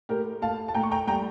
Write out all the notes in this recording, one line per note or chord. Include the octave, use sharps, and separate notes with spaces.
A2 G4 A#4
A2 F5 A5
A5
A2 G5 A#5
C#6
G5 A#5
G3 G5 A#5